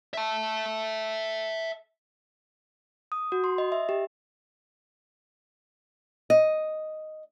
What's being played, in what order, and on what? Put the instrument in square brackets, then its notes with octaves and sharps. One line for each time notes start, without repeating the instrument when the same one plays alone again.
[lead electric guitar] E5 A5
[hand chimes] D#6
F#4
C6
D#5
E5
G4
[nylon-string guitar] D#5